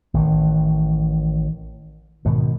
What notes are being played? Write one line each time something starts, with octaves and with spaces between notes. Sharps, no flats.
A1 D#3 E3
G#2 B2 D#3